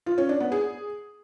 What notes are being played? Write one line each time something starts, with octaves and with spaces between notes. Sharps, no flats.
F4
C#4
D4
B3
G#4